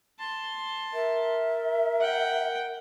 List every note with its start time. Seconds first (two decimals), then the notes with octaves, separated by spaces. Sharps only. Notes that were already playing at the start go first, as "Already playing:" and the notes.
0.19 A5 C6
0.94 A#4 E5
2.00 F#5 G5